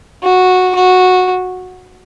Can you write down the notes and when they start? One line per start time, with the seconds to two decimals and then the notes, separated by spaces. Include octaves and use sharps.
0.23 F#4
0.75 F#4